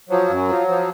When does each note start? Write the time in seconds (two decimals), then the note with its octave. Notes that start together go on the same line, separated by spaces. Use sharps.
0.09 F3 F#3
0.29 F#2
0.48 F3
0.68 F3